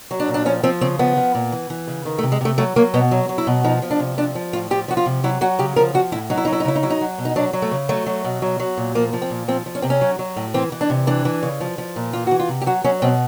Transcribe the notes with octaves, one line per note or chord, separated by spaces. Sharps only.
F#3
D4
A#2
D4
F3 C#4
F3 C4
C#3 C4
F3 B3
F3
A#2
E3
E3
C#3
D#3
A3
C3
G#3
C3 A3
F#3 A3
F#3 A#3
B2 B3
F#3
F#3
E4
B2
F3 D#4
F3
D4
C3
F3 D4
F3
A2 F4
F3 G4
F3 F#4
F4
C3
F#3 E4
F#3 F#4
C#3 G4
F3 A#4
F3 F#4
A2 E4
F#3 D#4
E4
F#3 D#4
E4
D#4
C#3 E4
D#4
F#3 E4
D#4
F#3
B2
D#4
F#3 D4
F#3
A3
C#3
F#3 A3
F#3
B2
F#3
F#3
A#2
F3 A#3
F3
C4
A#2
F3 C4
F3
C#4
C3 C4
C#4
F#3
F#3
A2
E3 C4
E3
D4
C3
E3 D4
E3
C#3
F3
F3
A#2
E3 F4
E3 F#4
F4
C3
G4
F#3 F#4
F#3 C#4
B2 C4